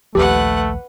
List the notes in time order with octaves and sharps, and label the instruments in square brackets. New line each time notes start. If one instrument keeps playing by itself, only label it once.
[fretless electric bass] A#1 D#2 F3 [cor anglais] A3 [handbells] G4 [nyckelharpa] B4 F#5